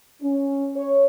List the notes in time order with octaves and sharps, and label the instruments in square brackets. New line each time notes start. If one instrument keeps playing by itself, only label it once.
[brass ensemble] C#4
C#5